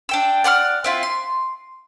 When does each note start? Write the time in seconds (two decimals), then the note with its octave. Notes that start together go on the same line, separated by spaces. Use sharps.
0.09 D4 G5 E6
0.44 D5 F#5 C#6 F6
0.84 C4 E4 F4
1.03 C6